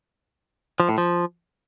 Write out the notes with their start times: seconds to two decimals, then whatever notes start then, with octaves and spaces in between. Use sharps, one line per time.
0.80 F3
0.89 A2
0.98 F3